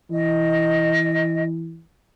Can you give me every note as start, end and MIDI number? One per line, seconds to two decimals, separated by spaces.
0.11 1.81 52
0.11 1.43 75